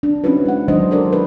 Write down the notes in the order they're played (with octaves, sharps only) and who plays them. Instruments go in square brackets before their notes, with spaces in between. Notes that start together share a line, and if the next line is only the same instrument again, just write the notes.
[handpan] D4
C4 C#4 D#4 E4 F#4 B4
G#3 F#5
D#3 F#3 D4 C5 D#5
D4 A4 A#4 C5 D5
E4 B4